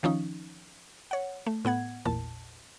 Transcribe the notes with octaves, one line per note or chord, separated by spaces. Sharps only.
D#3 F3 C#4 D#4
C#5 F#5
A3
A2 B3 F#5 G#6
A1 E2 A#2 A5